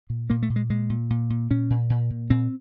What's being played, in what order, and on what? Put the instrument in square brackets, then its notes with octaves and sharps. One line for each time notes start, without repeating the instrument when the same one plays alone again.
[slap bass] A#2
A#2 A#3
A3
A#2
G#3
A#2 G#3
A#2
A#2
A#2
A#2 C#4
A#2
A#2
A#2
A#2 C4